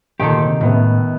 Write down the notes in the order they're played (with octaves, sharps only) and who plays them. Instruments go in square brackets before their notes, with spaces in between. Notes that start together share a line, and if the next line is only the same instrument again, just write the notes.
[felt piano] D2 A#2 C6 [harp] D#3 [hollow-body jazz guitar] G4 A4
[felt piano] C3
[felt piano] C#2 B3 E5 [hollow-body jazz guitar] A2